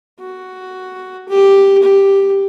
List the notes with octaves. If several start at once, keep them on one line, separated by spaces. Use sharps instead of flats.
F#4
G4
G4